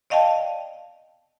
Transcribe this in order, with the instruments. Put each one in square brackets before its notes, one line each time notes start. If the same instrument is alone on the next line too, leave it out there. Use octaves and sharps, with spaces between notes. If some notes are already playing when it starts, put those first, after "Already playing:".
[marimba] D5 D#5 F5 G5 A5